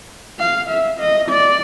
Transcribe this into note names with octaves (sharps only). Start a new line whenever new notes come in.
F5
E5
D#5
D5